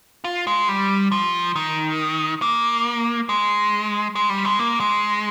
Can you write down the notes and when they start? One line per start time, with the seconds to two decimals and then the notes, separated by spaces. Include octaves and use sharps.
0.24 F4
0.47 G#3
0.68 G3
1.12 F3
1.56 D#3
2.42 A#3
3.29 G#3
4.15 G#3
4.29 G3
4.45 G#3
4.59 A#3
4.80 G#3